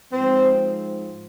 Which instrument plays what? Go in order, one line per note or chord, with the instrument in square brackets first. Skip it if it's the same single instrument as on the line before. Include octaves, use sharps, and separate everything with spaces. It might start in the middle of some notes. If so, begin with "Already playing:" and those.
[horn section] G#2 F3 C4